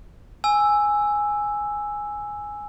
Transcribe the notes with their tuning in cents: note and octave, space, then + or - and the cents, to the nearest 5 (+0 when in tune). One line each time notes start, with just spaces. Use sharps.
G#5 +0 E6 +0